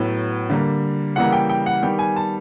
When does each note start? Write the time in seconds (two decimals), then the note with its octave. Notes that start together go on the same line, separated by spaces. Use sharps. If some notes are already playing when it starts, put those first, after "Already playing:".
Already playing: A2 F#3 B3
0.50 D3 G3 A#3
1.16 C#3 E3 G3 A#3 F#5
1.32 G5
1.49 G5
1.66 F#5
1.83 D#3 G3 B3 G5
1.99 G#5
2.16 A5